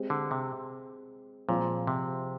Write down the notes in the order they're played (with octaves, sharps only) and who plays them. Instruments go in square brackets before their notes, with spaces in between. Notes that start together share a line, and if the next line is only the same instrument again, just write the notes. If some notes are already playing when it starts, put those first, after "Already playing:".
Already playing: [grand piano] G#3 C4 G4
[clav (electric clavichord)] D3
C3
[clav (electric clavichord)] A#2 [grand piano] F3 G#3 C4
[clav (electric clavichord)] C3